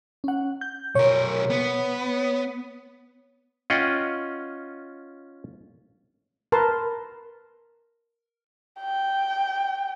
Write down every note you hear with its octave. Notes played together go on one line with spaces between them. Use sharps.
C#4 F#5
G6
B1 A#4 C#5
B3
C#4 F4 D#5 F#5 G5
A#4 B4 A5 C6
G5